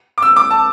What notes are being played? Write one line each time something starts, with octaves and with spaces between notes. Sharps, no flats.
D6
E6
D6
A5